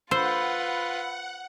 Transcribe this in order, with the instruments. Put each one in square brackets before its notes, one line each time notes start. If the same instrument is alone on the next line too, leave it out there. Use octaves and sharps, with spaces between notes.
[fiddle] F4 B4 [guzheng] C5 [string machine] F#5 [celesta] B5 E6